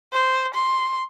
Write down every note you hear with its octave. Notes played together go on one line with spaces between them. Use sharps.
C5
C6